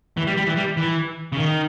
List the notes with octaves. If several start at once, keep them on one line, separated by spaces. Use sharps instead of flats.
E3
G3
G3
E3
G3
E3
C#3
D#3